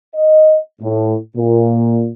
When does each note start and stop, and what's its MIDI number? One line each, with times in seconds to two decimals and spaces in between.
0.15 0.58 75
0.82 1.15 45
1.37 2.09 46